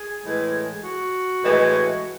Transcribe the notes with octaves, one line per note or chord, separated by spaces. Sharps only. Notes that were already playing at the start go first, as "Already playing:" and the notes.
Already playing: G#4
A2 E3 G#3
F#4
A2 E3 G#3